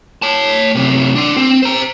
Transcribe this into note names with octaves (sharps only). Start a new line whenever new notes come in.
C#5 A5
F#2 C3
D4 C6
C4
C5 A#5